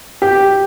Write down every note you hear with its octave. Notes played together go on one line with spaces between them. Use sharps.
G4